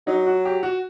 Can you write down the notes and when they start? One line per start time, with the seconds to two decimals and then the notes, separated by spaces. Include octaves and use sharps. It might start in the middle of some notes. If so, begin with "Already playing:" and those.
0.07 F#3 D#4
0.27 F#4
0.45 G4
0.63 F#4